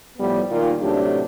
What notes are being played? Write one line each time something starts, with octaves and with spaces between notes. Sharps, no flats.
A2 F3 G3 B3
A#2 D#3 F4
A2 C3 F#3 A3 D4 G4